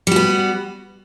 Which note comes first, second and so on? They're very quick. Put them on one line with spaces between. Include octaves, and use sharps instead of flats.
G3 F#4 B3